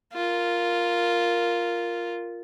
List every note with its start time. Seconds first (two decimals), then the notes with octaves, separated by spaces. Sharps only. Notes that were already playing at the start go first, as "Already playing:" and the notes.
0.13 F4 A#4